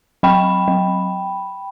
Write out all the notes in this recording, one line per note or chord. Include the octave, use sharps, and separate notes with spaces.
F#3 G5 B5
F#3